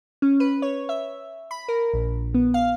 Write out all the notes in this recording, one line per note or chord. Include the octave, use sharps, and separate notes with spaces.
C#4
B4
C#5
E5
B5
A#4
A#1
B3
F5